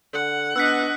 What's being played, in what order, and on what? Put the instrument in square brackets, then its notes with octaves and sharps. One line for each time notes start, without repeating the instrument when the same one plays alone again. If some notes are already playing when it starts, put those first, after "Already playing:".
[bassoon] D3 [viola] F#5
[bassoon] B3 [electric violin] D4 D#5 [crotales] E6 F#6 B6